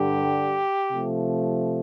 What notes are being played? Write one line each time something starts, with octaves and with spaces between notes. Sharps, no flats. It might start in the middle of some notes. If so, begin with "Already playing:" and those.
Already playing: G2 D3 G3 G4
C3 F3 A3